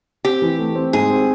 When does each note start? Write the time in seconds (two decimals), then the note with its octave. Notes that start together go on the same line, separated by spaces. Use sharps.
0.25 C4 G4
0.42 E3
0.59 A3
0.75 C4
0.93 G#2 G#4
1.10 C4